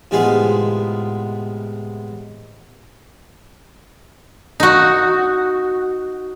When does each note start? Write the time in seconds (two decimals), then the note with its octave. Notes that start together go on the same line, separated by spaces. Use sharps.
0.11 A2 C3 G#3 B3 F4 G#4
4.60 D#4 F#4